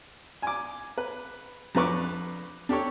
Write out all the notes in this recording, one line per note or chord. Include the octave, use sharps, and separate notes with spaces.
G#5 D6
B4
F2 D4 B4 C#6 D6
D4 G4 A4 C#5